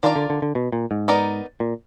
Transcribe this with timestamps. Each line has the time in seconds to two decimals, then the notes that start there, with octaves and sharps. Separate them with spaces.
0.03 D#3 D4 F4 A#4 D5
0.16 D3
0.30 D3
0.42 D3
0.55 B2
0.72 A#2
0.91 G#2
1.08 B3 D#4 A#4 D5
1.60 A#2